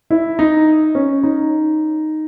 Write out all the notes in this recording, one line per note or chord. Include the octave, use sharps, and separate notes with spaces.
E4
D#4
C#4
D#4